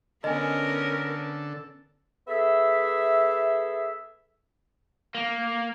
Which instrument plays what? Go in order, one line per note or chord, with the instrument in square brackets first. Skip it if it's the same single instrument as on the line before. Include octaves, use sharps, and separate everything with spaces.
[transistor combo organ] D3 A4 [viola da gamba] B3 C#4 [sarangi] A#4 [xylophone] D#5 G#5
[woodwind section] B3 G#4 A4 E5
[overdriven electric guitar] A#3